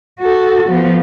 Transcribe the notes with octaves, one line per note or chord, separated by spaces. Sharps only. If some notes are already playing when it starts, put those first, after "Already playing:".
F#4 A4
F3 B3